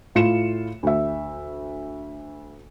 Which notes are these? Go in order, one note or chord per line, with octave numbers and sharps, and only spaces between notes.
A2 F4 C#7 E7
D2 E5